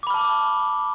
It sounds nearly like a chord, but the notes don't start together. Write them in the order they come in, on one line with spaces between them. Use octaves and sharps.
D6 B5 F6 A5